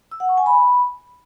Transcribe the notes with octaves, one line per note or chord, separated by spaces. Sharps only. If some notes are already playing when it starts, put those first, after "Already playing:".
E6
F#5
C#6
G#5
B5